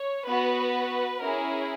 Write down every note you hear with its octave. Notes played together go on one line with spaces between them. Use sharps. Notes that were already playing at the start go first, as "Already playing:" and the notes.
Already playing: C#5
B3 F#4 B4
C#4 E4 G#4 A#4